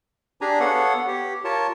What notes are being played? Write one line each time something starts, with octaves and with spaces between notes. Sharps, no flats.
D4 G4 G#4 G#5 A#5
B3 A4 C#5 F5 F#5
G4
F4 A#4 C#5 A5